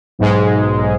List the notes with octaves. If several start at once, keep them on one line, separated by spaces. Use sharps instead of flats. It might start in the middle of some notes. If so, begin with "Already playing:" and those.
B1 G#2 G#3